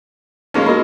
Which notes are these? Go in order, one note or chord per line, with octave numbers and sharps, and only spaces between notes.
G#3 A#3 C#4 D#4
F#4 A#4 B5